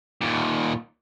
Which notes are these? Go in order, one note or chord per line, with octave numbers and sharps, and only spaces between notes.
D#2 A#2